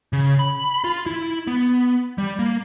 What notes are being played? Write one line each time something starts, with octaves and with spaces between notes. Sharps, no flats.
C#3
B5
F4
E4
B3
G3
A#3